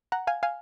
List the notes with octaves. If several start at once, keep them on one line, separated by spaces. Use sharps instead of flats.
F#5 A#5
F5 G#5
F5 G#5